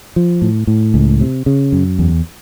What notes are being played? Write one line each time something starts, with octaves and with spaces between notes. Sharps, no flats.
F3
A2
A2
C#2
C3
C#3
F#2
E2